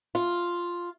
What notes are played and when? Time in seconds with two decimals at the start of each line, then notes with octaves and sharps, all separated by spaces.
0.15 F4